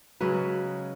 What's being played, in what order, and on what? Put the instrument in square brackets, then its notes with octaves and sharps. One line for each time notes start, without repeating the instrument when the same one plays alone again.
[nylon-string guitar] C#3 F#3 G#3 B4